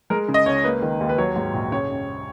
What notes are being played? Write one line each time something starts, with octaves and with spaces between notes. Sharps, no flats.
G#3 A#4
C#3
D#5
C#2 C#5
A#3 B4
D#3
D#2
B4
F#3 C#5
G#2
A#1
C#3 C#5
F#2